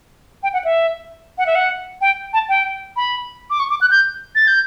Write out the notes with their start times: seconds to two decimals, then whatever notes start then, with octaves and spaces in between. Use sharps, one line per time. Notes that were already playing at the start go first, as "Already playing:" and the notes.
0.43 G5
0.53 F#5
0.64 E5
1.38 F#5
1.46 E5
1.55 F#5
2.01 G5
2.33 A5
2.49 G5
2.96 B5
3.50 D6
3.60 C#6
3.70 D6
3.81 F#6
3.91 G6
4.35 A6
4.48 G6